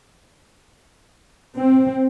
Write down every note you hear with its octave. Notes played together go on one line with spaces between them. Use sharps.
C4